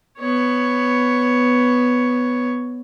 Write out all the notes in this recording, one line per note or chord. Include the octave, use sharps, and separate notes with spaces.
B3 C#5